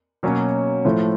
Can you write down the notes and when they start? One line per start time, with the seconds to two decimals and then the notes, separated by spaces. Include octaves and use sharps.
0.23 B2 F#3 A#3 C#4
0.85 A2 F3 A3